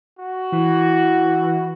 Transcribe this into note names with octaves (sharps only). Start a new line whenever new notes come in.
F#4
E3